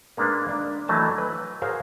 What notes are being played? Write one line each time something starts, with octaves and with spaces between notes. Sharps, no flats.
G#3 A#3 D4 A#4 B4
D4
E3 F#3 A3 D#5 A5
B4
F#4 G#4 A#4 C5 C#5 F5